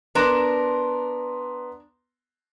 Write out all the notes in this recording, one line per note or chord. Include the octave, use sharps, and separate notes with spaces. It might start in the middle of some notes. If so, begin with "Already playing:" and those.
B3 D4 A#4 A#5 C6